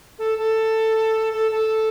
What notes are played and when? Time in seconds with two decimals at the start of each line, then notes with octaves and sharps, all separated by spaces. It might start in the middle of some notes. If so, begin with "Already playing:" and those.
0.19 A4
0.38 A4
1.33 A4
1.51 A4